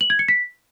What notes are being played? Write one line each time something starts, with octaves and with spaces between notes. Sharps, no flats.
F#7
G#6
C#7
B6